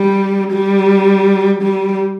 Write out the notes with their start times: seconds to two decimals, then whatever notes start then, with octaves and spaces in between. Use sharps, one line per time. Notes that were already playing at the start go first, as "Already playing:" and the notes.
Already playing: G3
0.52 G3
1.62 G3